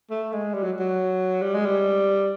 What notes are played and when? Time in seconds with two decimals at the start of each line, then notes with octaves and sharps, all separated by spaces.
0.10 A3
0.33 G#3
0.54 G3
0.63 F#3
0.79 F#3
1.42 G3
1.54 G#3
1.65 G3